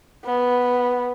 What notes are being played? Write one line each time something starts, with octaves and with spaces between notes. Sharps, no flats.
B3